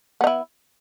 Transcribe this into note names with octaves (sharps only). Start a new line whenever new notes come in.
B3 D#4 E4